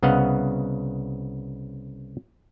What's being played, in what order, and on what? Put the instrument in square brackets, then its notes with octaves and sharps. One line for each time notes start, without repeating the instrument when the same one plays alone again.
[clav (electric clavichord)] C2 C#3 B3 D#5 F5 F#5